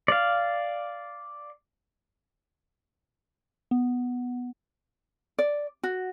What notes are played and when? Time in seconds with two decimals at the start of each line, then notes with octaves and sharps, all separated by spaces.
0.08 D5 F5
3.71 B3
5.39 D5
5.83 F#4